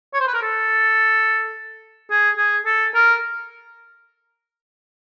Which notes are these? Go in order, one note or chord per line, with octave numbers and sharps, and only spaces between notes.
C#5
C5
B4
A#4
A4
G#4
G#4
A4
A#4